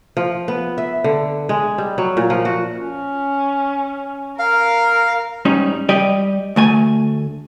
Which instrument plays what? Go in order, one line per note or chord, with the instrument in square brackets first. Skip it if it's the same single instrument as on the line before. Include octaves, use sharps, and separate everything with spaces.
[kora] F3
B3
E5
D3
G#3
G3
F#3
A#2
F3
F#4
[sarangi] C#4
[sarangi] A#4 [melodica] F5
[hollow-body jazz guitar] G#2 G3 C#4 D#4
G3 G4 D5 D#5
D2 A3 G#5